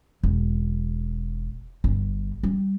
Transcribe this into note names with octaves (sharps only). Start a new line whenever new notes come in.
E1
G1
G3